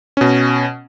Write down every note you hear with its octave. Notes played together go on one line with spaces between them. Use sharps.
B2 C#4